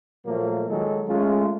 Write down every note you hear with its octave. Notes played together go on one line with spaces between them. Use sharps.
A#2 F3 F#3 A3 A#3
D#3 F#3 G#3 D#4 A4
G#3 A3 C#4 F4